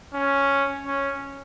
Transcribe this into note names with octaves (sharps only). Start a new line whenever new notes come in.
C#4
C#4